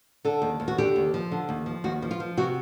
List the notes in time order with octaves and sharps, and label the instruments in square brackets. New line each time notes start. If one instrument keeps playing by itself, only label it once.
[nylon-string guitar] D3 A4
D#2
D#2
F#4
D3 G4
D#2
F3
D3
D#2
F3
D#2 F#4
F3
F4
F3
C3 F#4